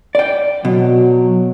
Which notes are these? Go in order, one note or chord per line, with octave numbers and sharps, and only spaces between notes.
D5 G5
B2 F#3